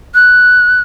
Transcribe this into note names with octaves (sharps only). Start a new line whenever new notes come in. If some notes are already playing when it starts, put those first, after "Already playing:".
F#6